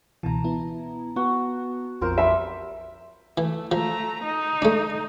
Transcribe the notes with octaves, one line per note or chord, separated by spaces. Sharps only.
C#2 B2 E3 A5 A#5
B3 E4
B3 F#4
A#1 F2 C4 F4 A#4 C5
G3 E5
E3 A3
F3 A3 A#5
D#4
A3 D4